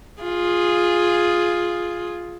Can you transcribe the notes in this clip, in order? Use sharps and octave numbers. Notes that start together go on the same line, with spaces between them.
F4 G#4